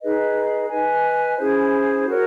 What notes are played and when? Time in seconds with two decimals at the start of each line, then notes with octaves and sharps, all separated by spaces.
0.01 D#4 G#4 B4 D#5
0.70 B4 D#5 G#5
1.37 C#4 E4 G#4 C5
2.07 F#4 A#4 C#5